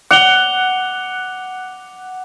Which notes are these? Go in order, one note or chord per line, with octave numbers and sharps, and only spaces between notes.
F#5 D6 F7 G7